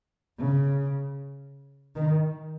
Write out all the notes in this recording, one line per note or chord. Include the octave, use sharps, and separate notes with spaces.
C#3
D#3